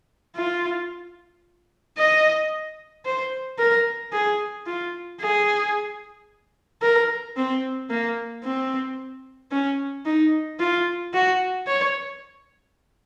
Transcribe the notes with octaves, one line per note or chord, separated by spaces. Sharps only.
F4
D#5
C5
A#4
G#4
F4
G#4
A#4
C4
A#3
C4
C#4
D#4
F4
F#4
C#5